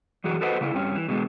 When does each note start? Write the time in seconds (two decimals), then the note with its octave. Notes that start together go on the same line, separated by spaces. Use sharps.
0.24 F#2 E3 F#4 G#4
0.41 F#4 A4 B4 C5 D#5 F#5
0.61 C#3 A#3 E4
0.74 G2 C4 C#4
0.95 E3
1.08 B2 D3 F#3 G#3